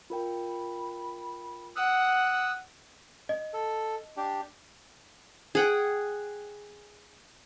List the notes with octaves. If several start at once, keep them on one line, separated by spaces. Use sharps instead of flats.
F4 A#4 G5 B5
F#5 D#6 E6 F#6
D#5
A4
D4 G4
G#4 F#5 G5